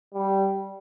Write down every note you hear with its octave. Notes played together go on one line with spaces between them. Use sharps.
G3